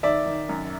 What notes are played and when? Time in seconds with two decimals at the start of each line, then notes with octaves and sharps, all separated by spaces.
0.03 D#3 D5 E5
0.26 D#3
0.49 F#2